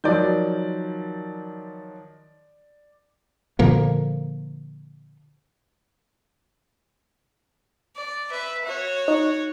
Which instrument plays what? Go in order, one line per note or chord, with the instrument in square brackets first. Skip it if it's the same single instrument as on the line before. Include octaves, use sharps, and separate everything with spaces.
[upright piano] D#3 F3 F#3 [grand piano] D5 G6
[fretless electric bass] A#2 D3 F3 A#3
[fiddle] D5
B4 E5
F#4 C#5
[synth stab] D#4